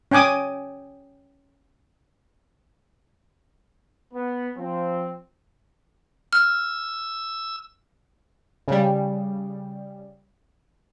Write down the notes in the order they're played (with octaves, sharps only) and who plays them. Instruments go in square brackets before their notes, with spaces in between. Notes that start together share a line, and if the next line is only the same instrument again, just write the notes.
[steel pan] C#4 G5 G#5 D6 D#6
[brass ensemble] B3
F3 C4
[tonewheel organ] E6 [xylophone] F6
[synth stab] C#3 G3